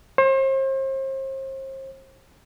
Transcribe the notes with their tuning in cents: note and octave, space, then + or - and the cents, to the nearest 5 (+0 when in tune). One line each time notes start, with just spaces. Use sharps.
C5 +40